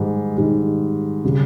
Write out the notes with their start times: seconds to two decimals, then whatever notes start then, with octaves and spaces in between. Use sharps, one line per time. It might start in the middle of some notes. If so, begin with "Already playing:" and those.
Already playing: G#2 D#3 G3
0.37 G#2 D#3 G3
1.25 C#3 G3